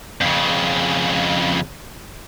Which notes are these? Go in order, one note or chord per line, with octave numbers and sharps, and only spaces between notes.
F2 C#3